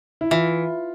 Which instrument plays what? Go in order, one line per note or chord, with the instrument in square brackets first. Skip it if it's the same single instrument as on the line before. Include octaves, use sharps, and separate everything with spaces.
[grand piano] E4
[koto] E3 [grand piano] F4